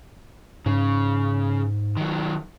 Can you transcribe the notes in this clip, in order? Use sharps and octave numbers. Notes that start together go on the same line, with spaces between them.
G#2 C#3
D#3 F#3